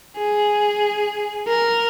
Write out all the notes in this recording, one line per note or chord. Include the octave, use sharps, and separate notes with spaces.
G#4
A#4